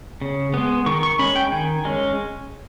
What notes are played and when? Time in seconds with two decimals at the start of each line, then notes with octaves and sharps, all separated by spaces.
0.21 C#3
0.54 G#3 B3
0.86 D#3 C#6
1.03 C#6
1.19 G#3 C#4 B5
1.36 G5
1.52 D#3 G#5
1.85 G#3 C#4